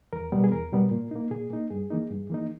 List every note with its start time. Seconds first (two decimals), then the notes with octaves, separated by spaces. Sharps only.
0.13 E2 A#4
0.32 B2 G3 B3
0.44 G#4
0.52 E2 A#4
0.72 B2 G3 B3
0.91 A#2
1.11 A#3 D#4
1.31 A#2 G#4
1.50 A#3 D#4
1.70 G2 G#4
1.91 E3 A#3 D#4
2.10 G2
2.30 E3 A#3 D#4